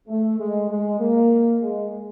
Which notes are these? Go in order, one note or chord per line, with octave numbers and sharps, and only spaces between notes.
A3
G#3
G#3
A#3
G#3